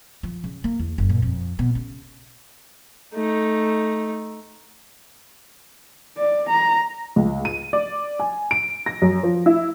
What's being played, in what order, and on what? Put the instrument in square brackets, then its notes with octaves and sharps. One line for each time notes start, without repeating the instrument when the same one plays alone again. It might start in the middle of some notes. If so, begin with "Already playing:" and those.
[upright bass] F3
C#3
A#3
E2
F#1
A#2
F2
B2
C#3
[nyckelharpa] A3 D#4
[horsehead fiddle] D5
A#5
[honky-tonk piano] C#2
D#7
D5
G#5
D7
A#6
F#2
F3
E4